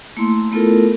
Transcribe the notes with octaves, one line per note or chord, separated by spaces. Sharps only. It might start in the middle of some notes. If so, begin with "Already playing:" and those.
A3 A#3 E4 C6
A3 B3 E4 F4 A4 A#4